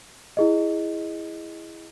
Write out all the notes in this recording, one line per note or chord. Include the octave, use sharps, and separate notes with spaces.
E4 G#4 D#5